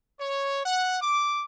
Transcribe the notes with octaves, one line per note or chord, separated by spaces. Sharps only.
C#5
F#5
D6